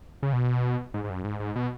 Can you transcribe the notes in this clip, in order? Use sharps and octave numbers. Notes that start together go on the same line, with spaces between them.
C#3
B2
G#2
G#2
F#2
G#2
G#2
B2